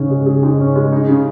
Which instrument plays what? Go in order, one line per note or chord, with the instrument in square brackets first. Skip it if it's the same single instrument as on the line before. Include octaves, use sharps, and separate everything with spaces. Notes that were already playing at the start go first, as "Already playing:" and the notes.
Already playing: [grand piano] G#2 C#4 G#4 [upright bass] C#3
[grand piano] G#3
G#4
G#2
C#4
G#3
D#4
C#3